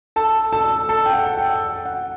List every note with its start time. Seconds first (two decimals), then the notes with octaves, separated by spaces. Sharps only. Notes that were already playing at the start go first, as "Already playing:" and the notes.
0.16 A4 A5
0.52 A4 A5
0.89 A4 A5
1.06 G5
1.13 F#5
1.37 G5
1.85 F#5